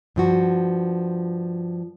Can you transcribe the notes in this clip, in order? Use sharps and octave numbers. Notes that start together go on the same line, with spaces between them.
G2 F3 F#4